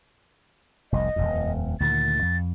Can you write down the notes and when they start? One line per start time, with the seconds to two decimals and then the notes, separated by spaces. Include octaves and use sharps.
0.92 F1 C2 D#5
1.16 D#1 G#1 F2
1.80 D2 A#2 D#3 A6
2.22 F2